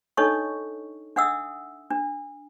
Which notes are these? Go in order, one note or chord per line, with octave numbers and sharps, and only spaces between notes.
D4 D#4 A4 C#5 D#5 C#6
D4 E5 F#5 D#6 E6
D4